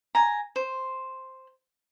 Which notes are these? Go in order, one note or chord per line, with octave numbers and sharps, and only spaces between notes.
G#5 A#5
C5